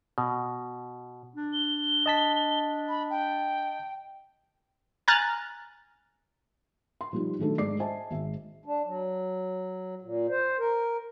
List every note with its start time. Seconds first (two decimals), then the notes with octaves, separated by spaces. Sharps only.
0.18 B2
1.36 D4
1.53 G7
2.06 D#5 A5 B6
2.89 B5
3.10 G5
5.08 G#5 A#5 F6 F#6 A6
7.01 C6
7.13 F3 G3 D#4
7.39 D#3 F#3 A3 D4 A4
7.58 G#2 D5 D6 C7
7.79 C5 D#5 E5 G#5 A5
8.10 G#1 G#2 E5
8.66 D4
8.86 F#3
10.02 A#2
10.29 C5
10.59 A#4